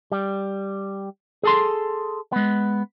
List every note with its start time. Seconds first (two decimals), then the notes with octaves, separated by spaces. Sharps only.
0.12 G3
1.43 G#4 A4 C6
2.32 G#3 B3